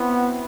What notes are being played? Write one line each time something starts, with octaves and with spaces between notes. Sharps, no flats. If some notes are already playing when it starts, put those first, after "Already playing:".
Already playing: B3 C4 E4 F#4